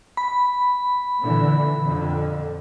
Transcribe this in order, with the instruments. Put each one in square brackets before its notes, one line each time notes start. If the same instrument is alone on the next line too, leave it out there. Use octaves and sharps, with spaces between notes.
[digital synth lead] B5
[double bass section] A#2 D3 E3
F2 D3